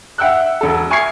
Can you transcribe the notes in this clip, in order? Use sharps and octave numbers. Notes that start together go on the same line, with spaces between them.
E5 F#5 G5 E6 F#6
E1 A4
E5 G#5 C#6 F6 G#6 C7